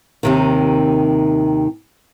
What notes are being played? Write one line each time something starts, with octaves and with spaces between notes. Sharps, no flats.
D#2 C3 D#3